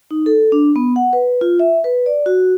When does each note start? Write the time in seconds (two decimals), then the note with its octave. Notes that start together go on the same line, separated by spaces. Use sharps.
0.11 D#4
0.26 A4
0.52 D4
0.76 B3
0.96 F#5
1.13 B4
1.41 F4
1.59 E5
1.84 B4
2.06 D5
2.26 F#4